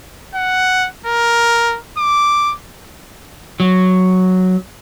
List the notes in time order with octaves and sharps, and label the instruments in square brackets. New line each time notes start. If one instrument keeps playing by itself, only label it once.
[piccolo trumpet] F#5
A#4
D6
[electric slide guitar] F#3